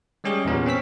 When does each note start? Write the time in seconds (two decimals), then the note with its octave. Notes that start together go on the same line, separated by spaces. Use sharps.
0.24 G3 G#3 C#4 G4 G#4
0.45 E2 A#2 B3 C#4
0.66 C4 C#4 E6 B6